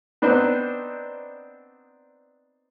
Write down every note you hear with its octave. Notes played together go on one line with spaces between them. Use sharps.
B3 C4 D4 D#4 B4 C5